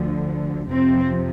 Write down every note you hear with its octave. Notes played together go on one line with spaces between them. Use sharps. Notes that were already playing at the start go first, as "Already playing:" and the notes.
Already playing: D2 D3 F3
F2 C3 F3 C4